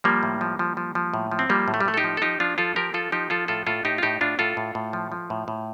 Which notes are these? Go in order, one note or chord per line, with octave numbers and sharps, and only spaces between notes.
F3 G3 A#3
A2
F3
F3
F3
F3
A2
F3
C4
F3 G3 A#3
A2
A3
G3
A2 A3
A4
D#4 G4
F3
A4
F3 D#4 G4
F3 D4 F4
F3 F4 A4
F3 G4 A#4
F3 F4 A4
F3 D#4 G4
F3 F4 A4
A2 F4 A4
A2 F4 A4
A2 D#4 G4
F4
A2 D#4 G4
A2 D4 F4
A2 F4 A4
A2
A2
F3
F3
A2
A2